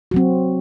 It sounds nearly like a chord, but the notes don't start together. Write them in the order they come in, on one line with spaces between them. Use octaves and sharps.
F#4 F#3 C4